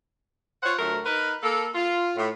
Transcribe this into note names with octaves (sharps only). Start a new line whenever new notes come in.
F4 C5 C#5 F#5
D2 F#3 A3 A#4
D#4 A#4 B4
A#3 A4
F4
A2